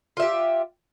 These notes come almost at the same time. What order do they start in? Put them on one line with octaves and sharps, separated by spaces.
F4 E5 G4